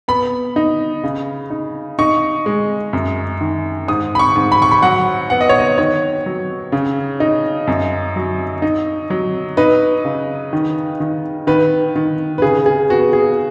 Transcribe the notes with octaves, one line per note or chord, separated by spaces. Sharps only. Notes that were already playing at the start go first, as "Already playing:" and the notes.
B3 B5
D#4
C#3
D#4
D#4 C#6
G#3
F#2
D#3
G#2 D#6
B5
C#6
G#2
B5
C#6
B5
F#3 F#5
B3 F#5
D#5
C#5
D#5
D#3 C#5
F#3
C#3
D#4
F#2
F#3
D#4
F#3
D#4 B4
C#3
D#3
D#3
D#3 B4
D#3
B4
C#3 G#4
G#4
B3 F#4
G#4